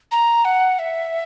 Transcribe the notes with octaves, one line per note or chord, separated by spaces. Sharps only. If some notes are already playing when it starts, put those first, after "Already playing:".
A#5
F#5
E5